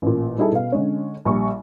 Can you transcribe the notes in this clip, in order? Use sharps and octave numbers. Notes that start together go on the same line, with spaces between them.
A1 A#2
G3 D#4 E4 G#4 A4
B2 F5
D3 G#3 C#4
A#1 G3 C#6